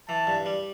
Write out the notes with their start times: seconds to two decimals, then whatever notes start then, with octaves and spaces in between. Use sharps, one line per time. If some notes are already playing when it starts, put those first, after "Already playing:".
0.09 E3 A5
0.27 G2
0.46 G3